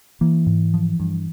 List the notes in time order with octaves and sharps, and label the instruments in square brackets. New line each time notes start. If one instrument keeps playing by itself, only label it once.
[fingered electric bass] E3 [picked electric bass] A#3
[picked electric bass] G#2
F3
G2